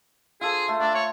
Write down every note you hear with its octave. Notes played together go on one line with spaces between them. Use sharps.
F4 G#4 A4 C5
A3
A3 D4
C#5